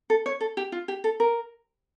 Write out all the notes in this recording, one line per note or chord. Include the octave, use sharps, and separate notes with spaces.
A4
C#5
A4
G4
F4
G4
A4
A#4